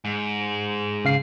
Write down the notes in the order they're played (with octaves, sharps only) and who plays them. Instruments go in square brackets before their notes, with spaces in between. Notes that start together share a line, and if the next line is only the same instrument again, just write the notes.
[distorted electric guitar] G#2
[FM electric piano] C#3 F5 C7